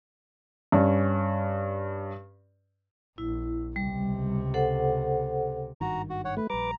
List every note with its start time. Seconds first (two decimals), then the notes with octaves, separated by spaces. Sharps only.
0.72 G2 C#4
3.18 A#1 E4
3.76 C#2 C3 G3
4.54 A4 C5 F#5
5.81 G#1 G2 D#3 F#4 A#5
6.10 F#4
6.25 C#5 F#5
6.37 A3 B4
6.50 A#1 G3 B4 A#5 D6